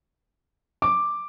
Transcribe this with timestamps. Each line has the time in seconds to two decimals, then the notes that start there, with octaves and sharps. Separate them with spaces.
0.82 D6